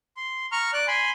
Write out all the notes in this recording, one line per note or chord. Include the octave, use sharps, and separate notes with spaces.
C6
A#5 C#6 F6
D5 F#6
G#5 B5 C6